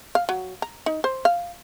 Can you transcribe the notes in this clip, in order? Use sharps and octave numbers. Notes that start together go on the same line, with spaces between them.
F5
F#3
A#5
D#4
C5
F5